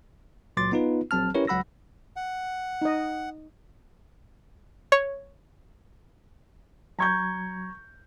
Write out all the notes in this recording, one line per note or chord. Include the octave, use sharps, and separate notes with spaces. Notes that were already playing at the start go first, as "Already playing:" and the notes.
C#2 A#2 F#3 C6 D6 A6
B3 D#4 F4 B4
A#1 F#3 C4 A5 F6
C#4 E4 G4 A#4 B4 C#5
C#2 F#3 F#5 B5 E6 A#6
F#5
D#4 D#5
C#5
F#3 A#5 C#6 G6 G#6